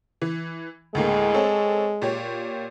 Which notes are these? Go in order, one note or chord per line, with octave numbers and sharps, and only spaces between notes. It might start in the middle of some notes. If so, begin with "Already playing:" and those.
E3
D2 A2 G#3 A#3
C4 A4 C#5
A#2 G4 C#5